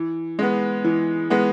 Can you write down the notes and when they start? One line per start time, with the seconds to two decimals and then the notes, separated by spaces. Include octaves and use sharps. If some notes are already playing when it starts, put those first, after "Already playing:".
Already playing: E3
0.39 G#3 B3
0.84 E3
1.30 G#3 B3